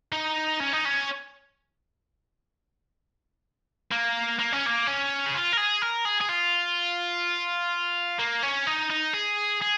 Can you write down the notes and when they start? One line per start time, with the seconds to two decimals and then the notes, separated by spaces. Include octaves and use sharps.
0.12 D#4
0.60 C#4
0.72 D#4
0.85 C#4
3.92 A#3
4.39 A#3
4.52 C#4
4.66 A#3
4.87 C#4
5.26 G#4
5.34 F4
5.52 A#4
5.57 G#4
5.82 A#4
6.05 G#4
6.21 G#4
6.29 F4
8.19 A#3
8.43 C#4
8.67 D#4
8.90 D#4
9.13 G#4
9.61 G#4